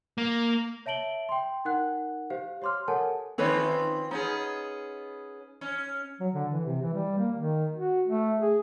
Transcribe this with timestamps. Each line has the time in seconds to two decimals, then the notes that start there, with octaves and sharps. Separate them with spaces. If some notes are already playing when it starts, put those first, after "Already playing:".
0.18 A#3
0.86 C#5 E5 A5 D7 F#7 G7
1.29 G5 C6
1.65 D#4 A#4 F#5 F#6
2.30 G4 C5 F5
2.62 G4 C#5 C6 D6 F6
2.88 A4 A#4 C#5 F#5 G#5 A5
3.38 D#3 F3 C4 C#4 B4 C#5
4.11 B3 C#4 D#4 G#4
5.61 C#4
6.20 F#3
6.34 D3
6.52 E3
6.65 C3
6.82 E3
6.94 G3
7.18 A#3
7.37 D#3
7.76 F#4
8.07 A3
8.40 G#4